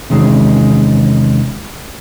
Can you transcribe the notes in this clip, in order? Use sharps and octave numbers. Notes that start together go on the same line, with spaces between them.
E2 C3 D#3 G#3 C#4